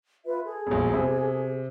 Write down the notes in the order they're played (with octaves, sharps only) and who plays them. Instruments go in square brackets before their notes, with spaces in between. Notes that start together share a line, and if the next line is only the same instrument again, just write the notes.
[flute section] F4 B4 E5
G#4 A4
[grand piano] E1 A#1
C3